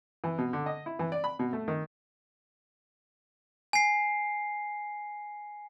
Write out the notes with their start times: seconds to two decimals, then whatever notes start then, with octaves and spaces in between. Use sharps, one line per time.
0.24 E3
0.38 B2
0.53 D3
0.66 D#5
0.86 E4
0.99 E3
1.12 D5
1.24 B5
1.39 B2
1.53 A3
1.68 D#3
3.73 G#5 C7